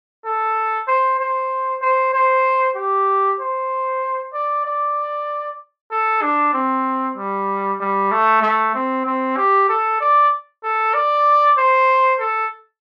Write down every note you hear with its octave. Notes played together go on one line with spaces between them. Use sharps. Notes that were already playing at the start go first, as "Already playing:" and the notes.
A4
C5
C5
C5
C5
G4
C5
D5
D5
A4
D4
C4
G3
G3
A3
A3
C4
C4
G4
A4
D5
A4
D5
C5
A4